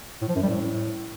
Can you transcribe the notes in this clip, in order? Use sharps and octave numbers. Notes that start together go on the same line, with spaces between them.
A2
F3
F#2
G3
A2